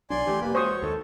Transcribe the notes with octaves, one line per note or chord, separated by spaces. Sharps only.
B1 F#3 D4 D5 G#5 C6
E3 A3 G4
E1 A#3 B4 B5
G#3 F#4 C5 C#5 C#6 D#6
D#2 D#3 A4